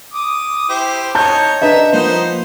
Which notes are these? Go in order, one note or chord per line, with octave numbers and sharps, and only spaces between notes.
D6 D#6
E4 G4 C5
D#4 C#5 A5 G6
D4 B4 D#5 E5 A#5
F3 A#3 B3 D#4 C5